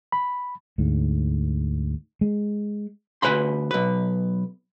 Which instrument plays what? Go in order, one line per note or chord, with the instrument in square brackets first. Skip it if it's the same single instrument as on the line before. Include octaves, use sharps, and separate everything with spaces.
[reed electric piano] B5
[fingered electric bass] D2 G#2
G#3
[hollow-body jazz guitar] D2 D#3 B4 G#5 B5 C6
B1 B4